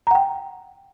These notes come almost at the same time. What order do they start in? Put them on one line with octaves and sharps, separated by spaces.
A#5 F#5 G5